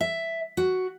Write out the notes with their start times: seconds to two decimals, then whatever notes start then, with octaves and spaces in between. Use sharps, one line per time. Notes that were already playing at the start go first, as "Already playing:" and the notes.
0.01 E5
0.57 F#4